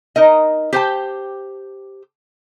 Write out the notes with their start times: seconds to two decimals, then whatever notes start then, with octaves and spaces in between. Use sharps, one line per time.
0.16 D#4 A#4 D#5
0.73 G4 C5 G5 A5